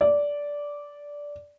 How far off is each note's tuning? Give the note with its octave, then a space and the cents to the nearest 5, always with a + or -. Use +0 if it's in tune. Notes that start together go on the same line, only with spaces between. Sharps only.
D5 -10